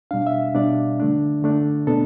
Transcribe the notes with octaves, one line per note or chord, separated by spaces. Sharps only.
B2 G3 D4 F5
E5
B2 G3 D4 D5
D3 A3 D4
D3 A3 D4
B2 B3 D4 A4